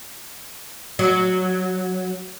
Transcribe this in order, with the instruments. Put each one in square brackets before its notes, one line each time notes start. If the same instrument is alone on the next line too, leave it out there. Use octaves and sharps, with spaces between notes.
[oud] F#3